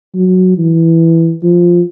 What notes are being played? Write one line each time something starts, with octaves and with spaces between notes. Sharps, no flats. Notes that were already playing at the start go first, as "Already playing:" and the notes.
F#3
E3
F3